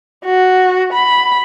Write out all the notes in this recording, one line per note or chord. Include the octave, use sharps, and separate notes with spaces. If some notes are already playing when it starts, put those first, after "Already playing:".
F#4
B5